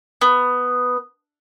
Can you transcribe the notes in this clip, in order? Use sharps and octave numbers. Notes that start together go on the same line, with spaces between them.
B3